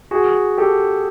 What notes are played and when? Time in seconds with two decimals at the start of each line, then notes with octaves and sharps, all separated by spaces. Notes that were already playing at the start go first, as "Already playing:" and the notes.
0.11 F#4 G#4
0.58 G4 A4